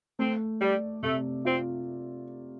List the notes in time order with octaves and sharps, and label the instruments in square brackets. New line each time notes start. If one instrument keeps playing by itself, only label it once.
[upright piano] A3 [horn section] C4
[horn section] G3 [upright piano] D5
[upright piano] C3 [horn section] A3
[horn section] C4 [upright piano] F4